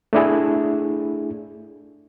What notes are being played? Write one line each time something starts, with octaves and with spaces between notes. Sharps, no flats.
A3 D4 E4 G#4